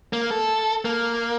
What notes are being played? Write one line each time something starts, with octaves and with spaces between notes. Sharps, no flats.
A#3
A4
A#3